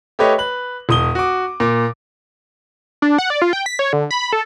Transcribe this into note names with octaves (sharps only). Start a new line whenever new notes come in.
A3 G4 B4 C#5 D#5
B4 F#7
E1 D#6 G7
F#4 D6
A#2 D6
D4
F#5
D5
F4
G5
B6
C#5
D3
B5
A4